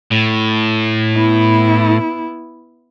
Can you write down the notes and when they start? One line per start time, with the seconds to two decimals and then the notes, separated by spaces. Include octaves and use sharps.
0.11 A2
1.14 B3 E4